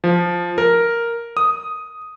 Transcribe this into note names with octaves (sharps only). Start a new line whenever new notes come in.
F3
A#4
D#6